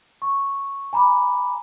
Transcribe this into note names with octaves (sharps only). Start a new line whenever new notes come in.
C#6
G#5 A#5 B5 D6